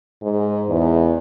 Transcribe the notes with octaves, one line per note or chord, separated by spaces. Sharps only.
G#2
E2